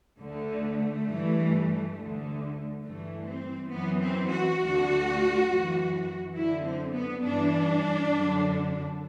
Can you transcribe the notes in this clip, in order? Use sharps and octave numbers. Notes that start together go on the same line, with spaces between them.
D2 D3 A3
G2 E3
D2 D3
G2 E3 A3
C4
F#2 E3 B3
C4
F#4
D2 D3
F#2 E3
F#2 D3 E4
C4
B3
G2 E3 D4
F#2 D3